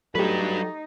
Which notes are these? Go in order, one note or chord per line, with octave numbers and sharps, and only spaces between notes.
F#3 G3 A3 D#4 G4 B4